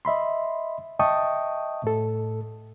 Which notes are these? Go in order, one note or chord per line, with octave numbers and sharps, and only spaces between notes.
D#5 E5 B5 C6
D#5 E5 G5 A5 C#6 D#6
A2 A4